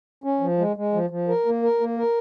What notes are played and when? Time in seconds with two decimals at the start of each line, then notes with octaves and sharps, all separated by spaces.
0.24 C#4
0.41 F3
0.58 G#3
0.76 G#3
0.93 F3
1.10 F3
1.28 A#4
1.46 A#3
1.63 A#4
1.80 A#3
1.97 A#4